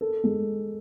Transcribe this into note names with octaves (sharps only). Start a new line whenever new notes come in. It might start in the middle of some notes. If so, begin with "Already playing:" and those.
A4
G#3